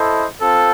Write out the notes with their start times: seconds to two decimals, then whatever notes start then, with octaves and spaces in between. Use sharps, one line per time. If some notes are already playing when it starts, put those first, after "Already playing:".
Already playing: E4 A4 C5 D#5
0.40 C4 F4 A4